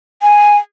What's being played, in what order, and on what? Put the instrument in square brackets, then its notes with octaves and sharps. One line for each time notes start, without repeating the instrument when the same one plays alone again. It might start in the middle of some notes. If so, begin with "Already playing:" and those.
[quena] G#5